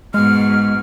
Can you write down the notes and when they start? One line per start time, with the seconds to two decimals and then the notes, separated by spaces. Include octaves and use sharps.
0.14 G#2 B2 G#3 F6